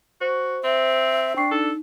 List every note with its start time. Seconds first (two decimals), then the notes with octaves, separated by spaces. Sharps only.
0.21 F#4 C5
0.64 C4 E5
1.36 D4 G5 C#6 C7
1.51 D#4 A4